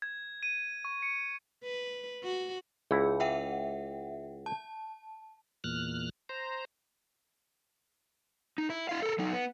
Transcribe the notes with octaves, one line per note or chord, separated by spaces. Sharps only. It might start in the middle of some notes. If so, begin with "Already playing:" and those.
G#6
D#7
C#6
C#7
B4
F#4
C#2 E4 G#4
E5 F#5 G5
A5
E2 A#2 F6 F#6
C5 A#5
D#4
E4
E4 F5
A4 A#4
F#3 D#4
B3